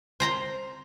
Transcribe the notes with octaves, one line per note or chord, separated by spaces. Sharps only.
C5 A#5 C6